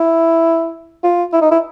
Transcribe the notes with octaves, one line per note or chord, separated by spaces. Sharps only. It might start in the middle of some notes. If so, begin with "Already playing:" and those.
Already playing: E4
F4
E4
D#4
E4